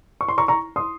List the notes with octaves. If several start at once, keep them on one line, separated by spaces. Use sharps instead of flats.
C#6
C6
A#5 C#6
A#5 C#6
C6 D#6